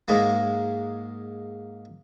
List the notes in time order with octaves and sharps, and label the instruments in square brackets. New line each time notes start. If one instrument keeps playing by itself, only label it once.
[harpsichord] G#2 G#3 A#3